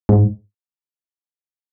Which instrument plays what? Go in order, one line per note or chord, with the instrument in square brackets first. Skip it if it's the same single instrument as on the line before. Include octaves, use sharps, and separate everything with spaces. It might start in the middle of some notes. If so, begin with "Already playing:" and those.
[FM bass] G#2